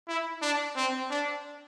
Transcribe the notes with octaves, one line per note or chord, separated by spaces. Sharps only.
E4
D4
C4
D4